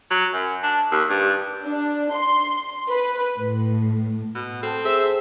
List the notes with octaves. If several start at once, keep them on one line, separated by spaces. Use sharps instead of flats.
F#3
F#2
D4
D#2
G2
D4
C6
B4
A2
B2
C4 A4 A5
G#4 C5 E5 E6